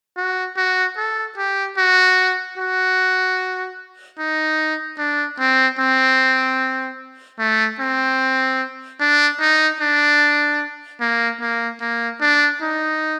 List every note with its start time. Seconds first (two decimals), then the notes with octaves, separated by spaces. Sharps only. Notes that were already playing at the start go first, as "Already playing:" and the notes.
0.17 F#4
0.57 F#4
0.97 A4
1.38 G4
1.78 F#4
2.58 F#4
4.19 D#4
4.99 D4
5.40 C4
5.79 C4
7.39 A3
7.80 C4
9.00 D4
9.40 D#4
9.81 D4
11.01 A#3
11.41 A#3
11.81 A#3
12.21 D4
12.62 D#4